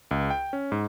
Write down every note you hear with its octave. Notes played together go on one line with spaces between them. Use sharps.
C#2
G5
C#4
G#2